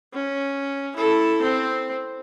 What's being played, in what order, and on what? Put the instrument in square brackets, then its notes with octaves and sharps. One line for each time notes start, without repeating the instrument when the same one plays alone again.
[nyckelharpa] C#4
E4 A4
C4